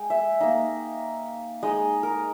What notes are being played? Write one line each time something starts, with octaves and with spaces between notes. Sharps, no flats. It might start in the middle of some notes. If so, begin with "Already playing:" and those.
Already playing: G#3 G5
E5
A#3 D#4
G#3 D#4 D#5
A#4